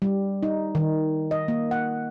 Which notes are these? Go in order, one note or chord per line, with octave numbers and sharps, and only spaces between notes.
G3
D#4
D#3
D#5
A#3
F#5